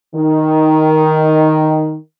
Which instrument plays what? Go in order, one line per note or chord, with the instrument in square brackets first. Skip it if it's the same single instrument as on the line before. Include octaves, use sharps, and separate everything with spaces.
[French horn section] D#3